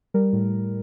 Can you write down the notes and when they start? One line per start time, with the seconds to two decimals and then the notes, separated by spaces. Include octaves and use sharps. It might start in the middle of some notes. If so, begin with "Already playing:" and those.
0.14 G3 A#4
0.33 A2